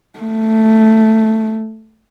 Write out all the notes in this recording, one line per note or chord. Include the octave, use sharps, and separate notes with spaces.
A3